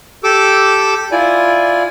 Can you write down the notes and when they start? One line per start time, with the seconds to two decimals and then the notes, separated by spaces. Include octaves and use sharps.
0.24 G4 A4 D6 E6
1.12 E4 F4 D5 G#5